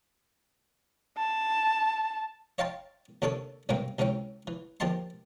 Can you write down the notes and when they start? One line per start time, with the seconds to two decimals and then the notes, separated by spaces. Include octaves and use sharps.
1.17 A5
2.58 C#5 D#5 F5 G5 A5 C6
3.22 D#2 C3 D4 A4 C#5 D#6
3.69 B1 G2 C3 A#3 G5
3.99 C#2 C3 E3 C#4 G5
4.47 E3
4.80 D#2 F3 G4 D#5 A5 C6